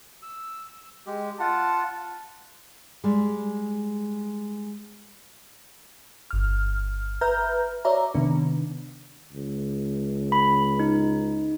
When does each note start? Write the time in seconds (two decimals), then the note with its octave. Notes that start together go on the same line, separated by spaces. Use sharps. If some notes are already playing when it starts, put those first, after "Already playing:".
0.23 E6
1.07 G#3 G4
1.40 F4 F#5 A5
3.04 G3 G#3
6.31 G1 F6
7.21 B4 E5 A#5 F6 G6
7.85 F#4 C#5 D5 E5 A#5
8.14 C3 D#3 B3 D4
9.32 C#2
10.32 B5
10.80 D#4